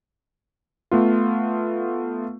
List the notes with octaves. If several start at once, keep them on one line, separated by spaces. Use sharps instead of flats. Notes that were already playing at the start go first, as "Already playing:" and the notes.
A3 B3 F4